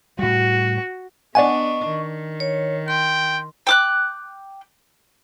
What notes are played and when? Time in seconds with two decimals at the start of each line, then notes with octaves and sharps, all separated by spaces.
0.19 A2 G3 F#4
1.35 B3 D4 D5 D#5 F#5 G#5 C#6
1.88 D#3
2.40 C#5
2.88 G5 C6
3.67 G5 D6 F#6